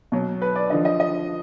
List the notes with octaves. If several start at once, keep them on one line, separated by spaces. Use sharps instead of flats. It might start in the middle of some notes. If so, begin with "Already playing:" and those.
B2 F#3
B4
D5
D3 F3 D#5
D#5
D#5